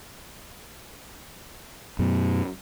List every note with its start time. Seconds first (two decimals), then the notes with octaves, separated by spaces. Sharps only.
1.99 F#2 B2